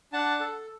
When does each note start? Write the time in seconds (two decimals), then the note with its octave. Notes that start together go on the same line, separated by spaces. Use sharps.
0.13 D4 F#5 A5
0.40 A4